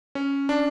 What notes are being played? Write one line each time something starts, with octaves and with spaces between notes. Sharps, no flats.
C#4
D4